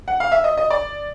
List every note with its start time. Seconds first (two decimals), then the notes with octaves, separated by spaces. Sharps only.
0.08 F#5
0.20 F5
0.32 E5
0.44 D#5
0.57 D#5
0.70 D5